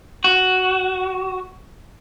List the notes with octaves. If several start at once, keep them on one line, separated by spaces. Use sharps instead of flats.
F#4